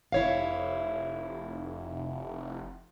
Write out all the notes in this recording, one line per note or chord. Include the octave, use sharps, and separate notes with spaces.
F1 E4 C#5 F5